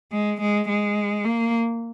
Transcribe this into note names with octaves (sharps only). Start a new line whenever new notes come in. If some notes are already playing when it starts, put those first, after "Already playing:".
G#3
G#3
G#3
A#3